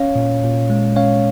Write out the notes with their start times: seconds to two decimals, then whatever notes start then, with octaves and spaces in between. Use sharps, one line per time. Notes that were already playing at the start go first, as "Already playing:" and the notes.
Already playing: C#4 C#5 F5
0.15 A#2
0.44 A#2
0.70 G#3
0.96 C#4 C#5 F5